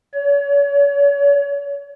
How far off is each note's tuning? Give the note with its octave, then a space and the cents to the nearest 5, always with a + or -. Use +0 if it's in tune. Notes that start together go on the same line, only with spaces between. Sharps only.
C#5 +40